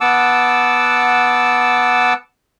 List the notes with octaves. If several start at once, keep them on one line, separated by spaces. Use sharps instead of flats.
B3 F#5 A5 D6 E6